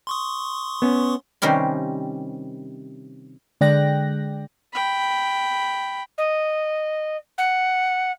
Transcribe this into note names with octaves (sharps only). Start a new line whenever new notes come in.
C6 C#6 D#6
B3 C#4
C3 D#3 G3 C#4 C6
D3 G#3 D5 G5 F#6 A#6
G5 B5
D#5
F#5